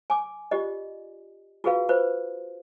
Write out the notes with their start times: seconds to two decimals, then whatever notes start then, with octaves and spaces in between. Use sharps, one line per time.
0.10 G#5 D6
0.51 F4 G4 D5 D#5
1.64 F4 F#4 G#4 B4 F5
1.89 F4 B4 C5